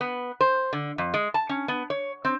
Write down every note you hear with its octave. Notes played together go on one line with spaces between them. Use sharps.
B3
C5
D3
F2
G#3
A5
C#4
B3
C#5
C4